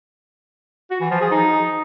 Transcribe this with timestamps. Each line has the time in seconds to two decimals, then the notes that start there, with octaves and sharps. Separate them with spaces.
0.91 F#4
1.01 E3
1.11 F3
1.21 G#4
1.31 D#4